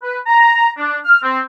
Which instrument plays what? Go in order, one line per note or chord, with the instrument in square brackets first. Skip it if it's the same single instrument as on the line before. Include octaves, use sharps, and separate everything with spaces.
[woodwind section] B4
A#5
D4
F6
C4